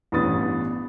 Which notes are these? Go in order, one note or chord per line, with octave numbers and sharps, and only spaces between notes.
A1 G2 B3 D#6 A6